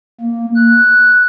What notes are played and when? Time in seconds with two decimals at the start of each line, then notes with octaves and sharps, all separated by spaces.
0.21 A#3
0.56 F#6